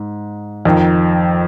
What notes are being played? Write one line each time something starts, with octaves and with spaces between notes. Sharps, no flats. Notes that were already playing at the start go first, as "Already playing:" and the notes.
Already playing: G#2
F2 D#3